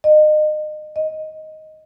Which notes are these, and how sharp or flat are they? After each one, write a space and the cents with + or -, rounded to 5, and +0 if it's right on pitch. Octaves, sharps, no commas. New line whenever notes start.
D#5 -30
D#5 +5